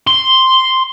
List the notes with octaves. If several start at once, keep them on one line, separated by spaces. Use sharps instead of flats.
C6